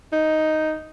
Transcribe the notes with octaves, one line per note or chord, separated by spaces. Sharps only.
D#4